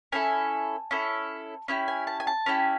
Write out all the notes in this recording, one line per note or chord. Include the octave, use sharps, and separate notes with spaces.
C#4 E4 A4 G#5
C#4 E4 A4
C#4 E4 G4
G#5
A5
G#5
A5
C#4 E4 G4